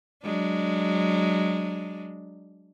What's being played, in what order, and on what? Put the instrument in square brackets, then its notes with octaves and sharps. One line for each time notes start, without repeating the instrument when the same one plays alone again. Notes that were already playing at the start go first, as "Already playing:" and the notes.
[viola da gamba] F#3 G#3 D4